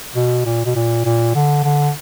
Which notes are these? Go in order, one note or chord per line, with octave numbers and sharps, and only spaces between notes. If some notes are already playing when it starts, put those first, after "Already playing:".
B2
A#2
B2
A#2
A#2
D3
D3